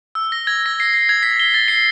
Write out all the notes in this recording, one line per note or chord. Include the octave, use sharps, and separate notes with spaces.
E6
A#6
G#6
A#6
C7
C7
G#6
B6
G7
A6
C7